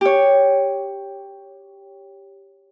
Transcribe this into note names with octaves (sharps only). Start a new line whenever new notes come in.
G4 C#5